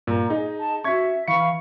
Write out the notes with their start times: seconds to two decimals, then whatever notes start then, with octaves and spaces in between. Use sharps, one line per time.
0.07 G2 A#2 A#5
0.30 D#4 G#4 D#5
0.60 A5
0.84 C#4 F#4 E5 C#6 G#6
1.28 E3 F5 B5 C#6 C#7